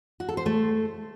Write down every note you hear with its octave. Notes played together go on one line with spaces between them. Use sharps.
F#4
A4
C5
A3